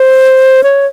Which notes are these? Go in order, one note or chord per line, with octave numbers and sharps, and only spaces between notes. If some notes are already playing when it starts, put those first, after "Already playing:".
Already playing: C5
C#5